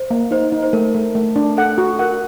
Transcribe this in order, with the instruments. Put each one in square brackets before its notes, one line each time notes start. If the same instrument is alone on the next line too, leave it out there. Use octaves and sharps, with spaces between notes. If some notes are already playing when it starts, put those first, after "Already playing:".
Already playing: [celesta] C5
[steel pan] A#3
[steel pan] D#4 [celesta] C5
[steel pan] D#4
[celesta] C5
[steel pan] A3 [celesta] A#4
[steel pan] A3
A3
D4
[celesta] A4 [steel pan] F#5
[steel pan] F#4
[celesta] A#4 [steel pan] F#5